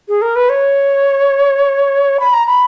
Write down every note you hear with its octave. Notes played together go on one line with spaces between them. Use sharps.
G#4
A#4
B4
C#5
B5
A#5
B5